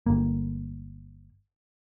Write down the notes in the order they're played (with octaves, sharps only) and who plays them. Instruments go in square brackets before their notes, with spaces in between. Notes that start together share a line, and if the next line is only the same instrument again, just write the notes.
[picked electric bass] G1 A#3